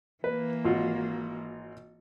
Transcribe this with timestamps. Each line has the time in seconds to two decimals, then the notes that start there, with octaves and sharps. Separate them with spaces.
0.24 E3 A#3 B4
0.65 G#1 F4 F#4